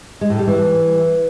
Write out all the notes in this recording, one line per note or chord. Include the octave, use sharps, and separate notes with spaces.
G#3
A2
G3
E3